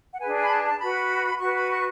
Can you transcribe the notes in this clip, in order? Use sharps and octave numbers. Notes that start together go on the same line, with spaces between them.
F#5
D4 G#4 B4 G#5
G#5
B5
A5
A5
F#4 B4 B5
F#4 B4 C#6
B5
C#6